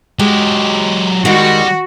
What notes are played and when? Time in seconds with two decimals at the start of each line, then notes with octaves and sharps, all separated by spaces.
0.20 F#3 G#3 G4
1.25 D#3 G3 G#3 F#4